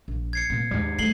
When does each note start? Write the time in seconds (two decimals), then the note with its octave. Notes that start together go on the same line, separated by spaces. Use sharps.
0.08 A#1
0.33 G#6 C7 C#7
0.50 A#2 C4
0.71 D#2 G#2 G3
0.99 A3 C7 F#7 G7